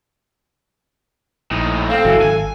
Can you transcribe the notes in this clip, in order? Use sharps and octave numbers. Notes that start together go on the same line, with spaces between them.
A#1 A2 D#4
C4 A4 F5
G1 C#3 E3 F#3
G#1 G#5